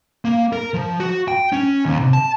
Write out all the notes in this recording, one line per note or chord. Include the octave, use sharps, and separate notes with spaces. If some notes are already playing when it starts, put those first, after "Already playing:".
A#3
A#4
F3
F#4
G5
C#4
D#2
C3
A5